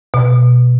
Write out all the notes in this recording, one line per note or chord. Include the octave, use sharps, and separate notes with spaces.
B2